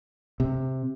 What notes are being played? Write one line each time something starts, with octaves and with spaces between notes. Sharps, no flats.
C3